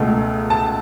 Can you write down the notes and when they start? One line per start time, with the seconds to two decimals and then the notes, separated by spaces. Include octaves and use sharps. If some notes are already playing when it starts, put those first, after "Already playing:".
Already playing: C#2 B2 A3
0.50 A5